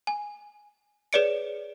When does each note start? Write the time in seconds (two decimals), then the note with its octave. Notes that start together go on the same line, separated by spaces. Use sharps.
0.07 G#5
1.13 G#4 B4 C#5 D5 C#7 D7